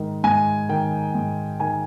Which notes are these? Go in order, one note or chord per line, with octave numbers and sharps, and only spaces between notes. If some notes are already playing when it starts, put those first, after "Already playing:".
Already playing: G#2 D#3
G#2 G#5
D#3 G5
G#2
D#3 G#5